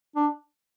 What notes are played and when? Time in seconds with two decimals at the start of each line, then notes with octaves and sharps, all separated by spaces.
0.16 D4